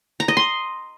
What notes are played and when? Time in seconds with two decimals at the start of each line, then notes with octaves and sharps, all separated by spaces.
0.20 A#5
0.28 D#5
0.37 C6